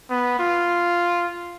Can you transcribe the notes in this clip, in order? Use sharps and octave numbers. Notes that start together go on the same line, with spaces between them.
B3
F4